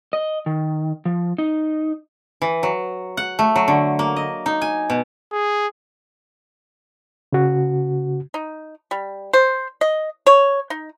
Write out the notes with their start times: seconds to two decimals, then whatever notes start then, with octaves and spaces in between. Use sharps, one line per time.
0.13 D#5
0.46 D#3
1.05 F3
1.38 D#4
2.42 E3
2.63 F#3
3.17 F#5
3.39 A3
3.56 F#3
3.68 D3
3.99 A#3
4.16 D#5
4.46 D#4
4.62 G#5
4.90 B2
5.32 G#4
7.33 C#3 F#4
8.34 D#4
8.91 G3
9.33 C5
9.81 D#5
10.27 C#5
10.70 D#4